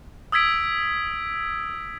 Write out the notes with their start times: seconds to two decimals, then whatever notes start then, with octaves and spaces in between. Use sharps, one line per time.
0.32 D#6 E6 G#6 B6 D7